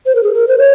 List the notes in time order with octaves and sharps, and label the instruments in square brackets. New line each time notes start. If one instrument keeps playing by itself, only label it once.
[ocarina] C5
A#4
G#4
A#4
C5
C#5